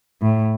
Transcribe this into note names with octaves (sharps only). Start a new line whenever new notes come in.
A2